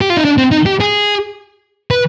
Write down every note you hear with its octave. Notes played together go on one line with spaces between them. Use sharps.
G4
F4
D#4
D4
C4
D#4
G4
G#4
B4